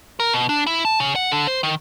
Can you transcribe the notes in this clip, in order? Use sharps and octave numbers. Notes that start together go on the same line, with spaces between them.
A#4
B2
D4
E4
A5
C#3
F#5
D3
C5
D#3